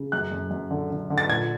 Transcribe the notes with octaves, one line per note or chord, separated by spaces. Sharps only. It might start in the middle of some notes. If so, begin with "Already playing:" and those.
Already playing: C#3
F#2 F#6
F#2
F#2
D3
D3
D3
A6
A#2 G#6